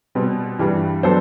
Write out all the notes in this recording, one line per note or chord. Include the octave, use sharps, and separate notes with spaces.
B2 G3 C4
G2 E3 G3 D4
F#3 B3 D4 A4 C5